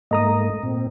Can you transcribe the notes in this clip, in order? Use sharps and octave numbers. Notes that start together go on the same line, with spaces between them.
G#2 A3 A#3 D#5 A#5 D#6
A#2 C4